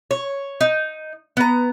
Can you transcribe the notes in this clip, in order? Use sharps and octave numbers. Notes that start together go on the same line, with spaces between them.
C#5
D#4
B3 A#5